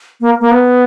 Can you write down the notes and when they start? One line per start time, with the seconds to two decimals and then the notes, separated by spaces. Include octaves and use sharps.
0.21 A#3
0.40 A#3
0.51 B3